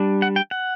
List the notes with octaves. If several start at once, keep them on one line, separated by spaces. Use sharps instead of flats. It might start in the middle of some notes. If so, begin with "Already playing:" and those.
Already playing: G3 D4
F#5
G5
F#5